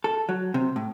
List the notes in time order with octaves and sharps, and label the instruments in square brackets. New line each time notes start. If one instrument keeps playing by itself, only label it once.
[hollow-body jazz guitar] A4
F#3
C3
A2